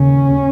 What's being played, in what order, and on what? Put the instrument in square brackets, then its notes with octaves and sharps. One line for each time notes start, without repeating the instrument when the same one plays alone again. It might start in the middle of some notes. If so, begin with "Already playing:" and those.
Already playing: [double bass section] D#2 C#3 C#4